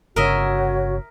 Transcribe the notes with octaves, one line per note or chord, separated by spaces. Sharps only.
G1 C#3 F#4 A#4 C#5 D#5 E5